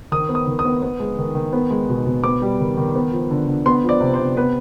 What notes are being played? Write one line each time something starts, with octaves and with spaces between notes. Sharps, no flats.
D#3 D#6
B3
D#6
D#3
D#6
B3
B3
G#3
D#3
D#3
B3
G#3
B2
B2
B3 D6
G3
D#3
D#3
B3
F3
D3
D3
B3 C6
F3 D5
C3
C5
C3
B3 B4